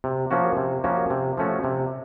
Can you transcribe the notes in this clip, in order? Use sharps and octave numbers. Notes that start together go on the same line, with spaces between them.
C3
F3 A#3 C#4 F#4
C3
F3 A#3 C#4 F#4
C3
F3 A3 C#4 F#4
C3